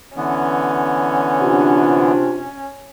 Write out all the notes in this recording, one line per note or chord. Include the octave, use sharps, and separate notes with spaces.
D3 E3 B3 C#4
C3 D4 F4